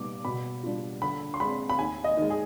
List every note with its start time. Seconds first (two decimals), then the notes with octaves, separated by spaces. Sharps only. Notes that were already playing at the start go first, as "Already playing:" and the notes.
Already playing: B2 G3 B3 D#4 D6
0.25 B2 B5
0.63 G3 D4 F4
1.02 D3 B5
1.34 C6
1.40 G#3 C4 B5
1.70 B5
1.79 D#2 G#5
2.04 D#5
2.17 D#3 G#3
2.30 G#4